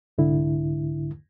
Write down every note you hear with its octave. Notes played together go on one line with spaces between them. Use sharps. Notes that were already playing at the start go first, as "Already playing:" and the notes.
C2 G#2 D3 E4